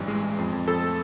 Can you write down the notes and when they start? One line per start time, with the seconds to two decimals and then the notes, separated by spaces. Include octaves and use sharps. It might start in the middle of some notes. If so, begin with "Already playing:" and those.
Already playing: A1 G2 E3
0.08 G#3
0.23 G#3
0.38 F2
0.53 F2
0.68 F2 A4
0.83 A3